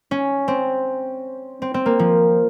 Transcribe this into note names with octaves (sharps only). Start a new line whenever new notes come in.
C#4
C4
C4
C4
A#3
F3